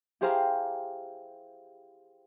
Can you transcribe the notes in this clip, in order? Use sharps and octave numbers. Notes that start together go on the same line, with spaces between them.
E4 G4 G#4 C5 F5 A#5